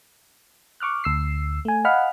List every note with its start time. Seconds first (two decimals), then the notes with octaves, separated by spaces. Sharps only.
0.80 C#6 D6 F6 F#6
1.04 D2 E6 C7
1.65 A3 G#5
1.85 D#5 F5 F#5 G#5 B5 F6